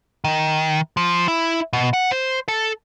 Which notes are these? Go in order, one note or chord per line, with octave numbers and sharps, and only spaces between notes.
D#3
F3
E4
B2
F#5
C5
A4